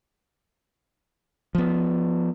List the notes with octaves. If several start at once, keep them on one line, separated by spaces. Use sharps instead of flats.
F3 B3